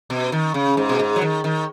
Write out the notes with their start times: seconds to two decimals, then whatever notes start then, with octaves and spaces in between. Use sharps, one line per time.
0.10 B2
0.32 D#3
0.54 C#3
0.77 G#2
0.89 B2
0.99 G#2
1.16 F#3
1.21 D#3
1.44 D#3